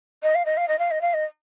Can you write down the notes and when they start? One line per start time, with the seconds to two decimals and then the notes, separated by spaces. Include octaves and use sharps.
0.23 D#5
0.35 F5
0.45 D#5
0.57 F5
0.68 D#5
0.79 F5
0.91 D#5
1.01 F5
1.14 D#5